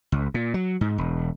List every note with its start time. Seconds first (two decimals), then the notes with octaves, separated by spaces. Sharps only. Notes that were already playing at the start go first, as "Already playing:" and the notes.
0.12 C#2
0.34 A#2
0.54 F#3
0.81 G#2
0.98 E1